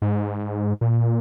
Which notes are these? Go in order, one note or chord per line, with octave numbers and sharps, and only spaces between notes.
G#2
A#2